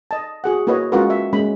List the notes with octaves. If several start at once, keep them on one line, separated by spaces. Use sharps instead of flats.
D#5 A5
F#4 G#4 F#5
A#3 E4 F#4 B4 C#5 D#5
G#3 C#4 F4 F#4 A#4 B4
E5
G#3 A#3 C#4 B5